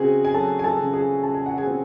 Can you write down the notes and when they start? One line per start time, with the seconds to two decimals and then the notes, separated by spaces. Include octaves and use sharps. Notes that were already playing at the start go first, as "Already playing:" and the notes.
Already playing: C#3 C4 F#4 G#4 G#5
0.25 G#5
0.34 F#3 A4 A5
0.59 G#5
0.64 A4 A5
0.79 C#3
0.94 G#4 G#5
1.23 C#3 A5
1.34 G#5
1.46 F#5
1.58 G#4 G#5
1.67 C4